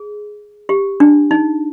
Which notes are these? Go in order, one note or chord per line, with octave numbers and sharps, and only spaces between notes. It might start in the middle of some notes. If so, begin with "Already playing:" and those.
Already playing: G#4
G4
D4
D#4